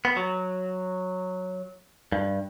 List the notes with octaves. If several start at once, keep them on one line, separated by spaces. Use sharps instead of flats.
B3
F#3
G2